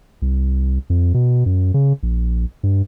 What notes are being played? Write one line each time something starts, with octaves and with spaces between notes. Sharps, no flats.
C2
F2
B2
F#2
C#3
A#1
G2